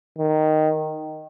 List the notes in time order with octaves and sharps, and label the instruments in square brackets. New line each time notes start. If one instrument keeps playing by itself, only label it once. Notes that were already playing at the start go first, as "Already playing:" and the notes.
[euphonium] D#3